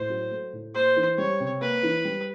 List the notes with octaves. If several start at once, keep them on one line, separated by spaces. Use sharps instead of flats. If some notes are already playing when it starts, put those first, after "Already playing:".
Already playing: A2 C5
F#3
A3
A2
A#3 C5
E3
G3 C#5
C3
A#3 B4
E3
G3